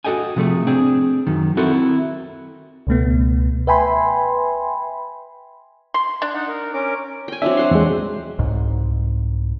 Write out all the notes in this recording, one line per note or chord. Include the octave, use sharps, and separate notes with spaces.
F#4 G4 A4 D#5 G5 G#5
C3 F3 A3 G#4
C4 D4 G#4
F#2 D#3
C4 E4 F#4 A4 A#4
C#2 B2 A3 B3
B4 E5 G5 G#5 B5 C6
C6
D4
D#4 F#5
A#4
C#4 A#4 D6
G5 G#5
F#3 C4 D4 E5
C5 F#5 C6
E2 G#3
C2 G#2